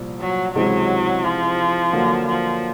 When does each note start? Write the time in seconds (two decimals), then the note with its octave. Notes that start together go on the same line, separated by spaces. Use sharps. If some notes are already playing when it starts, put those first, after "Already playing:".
Already playing: C2 A#2 F3
0.20 F#3
0.55 C#2 C3 E3 F#3 G#3 C4
1.24 F3
1.93 D3 F#3 A#3
2.28 F3